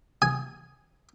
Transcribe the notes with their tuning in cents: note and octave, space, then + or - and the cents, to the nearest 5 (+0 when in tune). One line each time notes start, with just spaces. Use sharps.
G#5 +0 D#6 +0